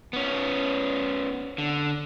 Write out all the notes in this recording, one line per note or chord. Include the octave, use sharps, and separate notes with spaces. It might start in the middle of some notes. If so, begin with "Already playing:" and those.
B3 C#4
D3